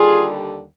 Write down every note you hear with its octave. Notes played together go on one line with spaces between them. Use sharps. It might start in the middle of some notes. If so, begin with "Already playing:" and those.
Already playing: D#2 D3 G3 F4 G#4